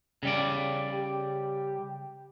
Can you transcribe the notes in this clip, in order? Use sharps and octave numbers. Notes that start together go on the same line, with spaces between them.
C#3 G3 D5
G4